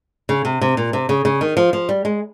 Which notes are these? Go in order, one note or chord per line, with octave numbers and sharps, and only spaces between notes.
C#3
C3
C3
A#2
C3
C#3
C#3
D#3
F3
F3
G3
G#3